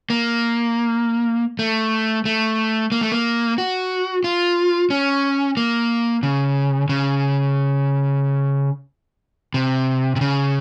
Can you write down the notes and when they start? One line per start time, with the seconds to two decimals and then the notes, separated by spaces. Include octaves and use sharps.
0.10 A#3
1.59 A3
2.25 A3
2.92 A#3
3.01 A3
3.12 A#3
3.58 F#4
4.24 F4
4.90 C#4
5.57 A#3
6.23 C#3
6.89 C#3
9.54 C3
10.16 C3
10.21 C#3